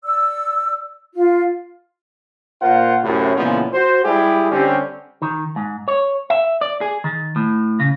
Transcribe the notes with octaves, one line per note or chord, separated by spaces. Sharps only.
D5 E6
F4
A#2 F4 A#4 C5 F5 F#5
F#2 A2 C3
A#2 C#3 E3 F3 G#3 B3
F#4 C5
G3 G#3 E4 G4 G#4
D3 G3 C4 C#4 G4
D#3
G#2
C#5
E5
D5
G#4
D#3
A2
C#3